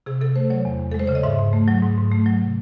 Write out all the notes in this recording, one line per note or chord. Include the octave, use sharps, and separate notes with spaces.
C3 G#4
C3 A4
A3 C5
F#3 C#5
E2
E2
G#3 A4
C5
C#3 C#5
D#5
G#2 E5
G#2
A3
F#3
G#2
G#2
A3
F#3
C3